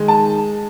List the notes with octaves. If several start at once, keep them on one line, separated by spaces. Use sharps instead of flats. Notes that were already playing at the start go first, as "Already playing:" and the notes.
Already playing: D#3 G#3
A5